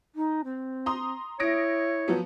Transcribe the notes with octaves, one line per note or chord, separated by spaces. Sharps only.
D#4
C4
A#5 C6 D#6
E4 C#5 D#6 A#6 D7
F3 F#3 B3